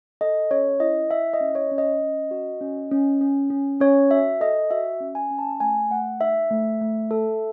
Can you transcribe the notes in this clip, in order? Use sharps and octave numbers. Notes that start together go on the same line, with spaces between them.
A4 D#5
C#4 C#5
E4 D#5
E4 E5
D#5
C#4
C#5
C#4
D#5
C#4
F#4
C#4
C#4
C#4
C#4
C#4 C#5
F#4 E5
A4 D#5
F#4 E5
C#4
G#5
C#4
A5
A3 G#5
A3 F#5
D#4 E5
A3
A3
A4